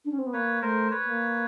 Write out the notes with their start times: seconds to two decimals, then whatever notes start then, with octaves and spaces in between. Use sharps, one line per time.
0.05 D4
0.11 C#4
0.19 C4
0.27 B3
0.33 A#3 B4 C#5
0.62 A3 A#4 C5
0.91 B4 C#5
1.06 A#3